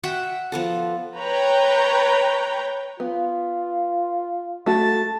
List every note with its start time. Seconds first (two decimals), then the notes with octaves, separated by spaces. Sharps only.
0.03 F#4 E5 F#5 G5
0.52 F3 B3 A4
1.16 B4 C#5 G5 A#5 B5
3.00 B3 F4
4.66 A3 F#4 A5